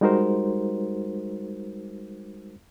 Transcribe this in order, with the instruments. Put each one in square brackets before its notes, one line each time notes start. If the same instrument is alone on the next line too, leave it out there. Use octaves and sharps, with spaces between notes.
[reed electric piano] G3 G#3 D#4 F#4 A#4 C5